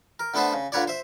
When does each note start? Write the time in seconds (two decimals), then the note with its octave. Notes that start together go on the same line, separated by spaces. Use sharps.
0.20 A#4
0.34 D3 A3 B3 A4 B4 C5
0.53 C#3
0.72 A#2 D3 B4 C#5 D5
0.88 C5 E5